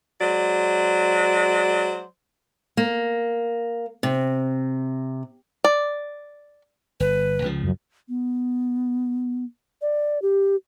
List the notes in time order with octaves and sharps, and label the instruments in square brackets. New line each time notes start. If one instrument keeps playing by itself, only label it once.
[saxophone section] F#3 G#3 C5 D5
[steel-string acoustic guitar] A#3
C3
[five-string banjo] D5
[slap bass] G1 [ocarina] B4
[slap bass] C#2 C#3 F3
[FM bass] F#2
[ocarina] B3
D5
G4